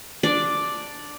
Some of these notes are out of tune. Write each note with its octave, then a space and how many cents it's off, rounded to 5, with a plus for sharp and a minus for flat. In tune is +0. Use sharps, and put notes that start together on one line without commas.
D4 +0 D5 +0